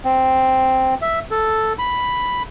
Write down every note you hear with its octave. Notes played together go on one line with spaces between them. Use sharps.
C4
E5
A4
B5